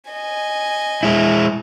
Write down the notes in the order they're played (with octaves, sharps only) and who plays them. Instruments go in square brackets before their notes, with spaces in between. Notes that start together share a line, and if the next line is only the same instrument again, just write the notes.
[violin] D#5 G#5
[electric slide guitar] G#3 E4